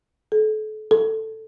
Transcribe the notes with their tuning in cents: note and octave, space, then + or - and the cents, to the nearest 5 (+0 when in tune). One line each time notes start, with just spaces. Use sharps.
A4 -35
A4 +5